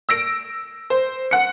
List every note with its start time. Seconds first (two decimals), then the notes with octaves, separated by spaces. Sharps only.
0.09 E6 A#6 D7
0.90 C5
1.31 F#5 C#7